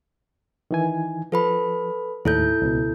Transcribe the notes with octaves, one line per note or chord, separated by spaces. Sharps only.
D#3 E3 G#5
F3 A4 B4 B5
D#2 A2 E4 A4 G6
C#2 B2